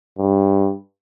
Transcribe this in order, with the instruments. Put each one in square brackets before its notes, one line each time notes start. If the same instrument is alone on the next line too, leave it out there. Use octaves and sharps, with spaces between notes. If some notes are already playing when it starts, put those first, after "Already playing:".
[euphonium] G2